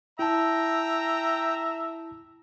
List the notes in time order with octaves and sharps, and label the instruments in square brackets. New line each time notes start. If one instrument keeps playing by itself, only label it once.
[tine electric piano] E4 A5 [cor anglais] E5 [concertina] G5 [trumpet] A#5